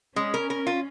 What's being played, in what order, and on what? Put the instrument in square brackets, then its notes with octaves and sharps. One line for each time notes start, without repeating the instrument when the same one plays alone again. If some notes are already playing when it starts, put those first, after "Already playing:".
[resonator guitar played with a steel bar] G#3 [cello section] C#4
[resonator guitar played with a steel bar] A#4
A#4
F4